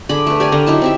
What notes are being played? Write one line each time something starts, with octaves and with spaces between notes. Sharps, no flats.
D3 G#4 B5 D6
A3 B4
G4 A#4 D5 G#5
D3 A#5
F#3 D#4 E4 A5
C4 G4 E5